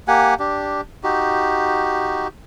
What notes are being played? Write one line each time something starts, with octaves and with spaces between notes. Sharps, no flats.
A#3 G4 F#5 G#5
D4 G4
D#4 F#4 G4